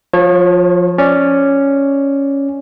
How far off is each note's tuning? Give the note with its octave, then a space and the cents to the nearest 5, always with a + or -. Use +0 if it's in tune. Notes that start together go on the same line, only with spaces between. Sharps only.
F3 +15 C#5 -30
C#4 +0 D5 +0